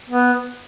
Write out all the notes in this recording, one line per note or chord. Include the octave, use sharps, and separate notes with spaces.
B3